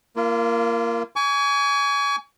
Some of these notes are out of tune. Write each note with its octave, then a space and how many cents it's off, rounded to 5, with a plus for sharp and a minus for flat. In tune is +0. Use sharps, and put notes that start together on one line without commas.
A#3 +0 F4 -35
G#5 +0 C#6 +40